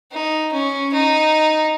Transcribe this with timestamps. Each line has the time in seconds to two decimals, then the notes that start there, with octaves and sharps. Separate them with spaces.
0.12 D#4
0.52 C#4
0.93 D#4